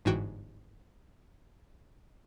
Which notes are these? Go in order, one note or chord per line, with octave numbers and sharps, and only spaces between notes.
G1 G#2 E3 F#4 G5